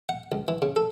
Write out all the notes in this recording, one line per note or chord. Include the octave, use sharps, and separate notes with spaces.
F#5
C#2
E3
C#3
A4